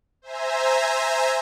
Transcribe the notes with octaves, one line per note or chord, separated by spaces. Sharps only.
C5 E5 G#5 A#5